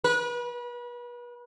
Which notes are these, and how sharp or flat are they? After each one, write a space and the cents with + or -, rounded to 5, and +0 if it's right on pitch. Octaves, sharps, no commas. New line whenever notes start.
B4 -35